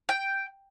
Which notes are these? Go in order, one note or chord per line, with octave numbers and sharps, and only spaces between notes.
G5